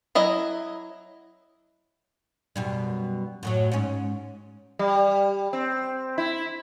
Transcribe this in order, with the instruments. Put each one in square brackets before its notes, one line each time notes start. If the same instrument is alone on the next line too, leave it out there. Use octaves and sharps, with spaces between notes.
[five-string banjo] F#3 E4 D#5
[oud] F#2 B2 G3
F#2 A2 F#3
G#2 C#4
[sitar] G3
C4
E4